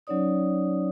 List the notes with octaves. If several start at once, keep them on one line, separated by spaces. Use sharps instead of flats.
F#3 C#4 D#4 C#5 D5 D#6